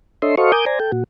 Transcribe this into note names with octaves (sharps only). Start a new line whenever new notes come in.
D4 A4 C#5 D#5 E5 C6
F#4 A4 C5 D#5 F5 C#6
A#4 G#5 D6 D#6 G6
C5 D5 G#5 A#5
A4 G5
A#2 F#4